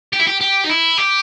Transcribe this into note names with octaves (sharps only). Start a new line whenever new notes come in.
G4
E4
G4
G4
D#4
E4
G4